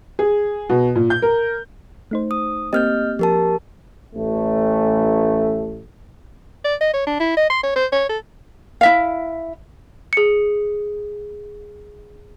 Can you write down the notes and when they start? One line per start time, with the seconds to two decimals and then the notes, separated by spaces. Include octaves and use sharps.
0.19 G#4
0.69 B2
0.95 A#2
1.10 G6
1.22 A#4
2.11 A3 D#4 C5
2.31 D#6
2.73 A#3 C4 G4 D#5 F6 G6
3.19 F3 G4 A#4 A5
4.15 A1 A3
6.64 D5
6.81 D#5
6.94 C#5
7.06 D4
7.20 E4
7.37 D#5
7.50 C6
7.63 C#5
7.76 C5
7.92 C#5
8.09 A4
8.81 E4 E5 F5
10.13 G#4 C#7